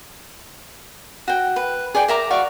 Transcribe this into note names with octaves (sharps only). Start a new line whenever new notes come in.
F#4 G5
B4
G#4 D5 G5
A#4 E5 A#5 D6
F#4 D5 F5 C#6